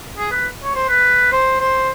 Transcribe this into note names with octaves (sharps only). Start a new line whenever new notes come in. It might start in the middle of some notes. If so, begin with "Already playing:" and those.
G#4
B4
C#5
C5
B4
C5
C5